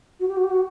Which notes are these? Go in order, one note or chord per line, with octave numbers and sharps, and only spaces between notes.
F#4
G4
F#4
G4
F#4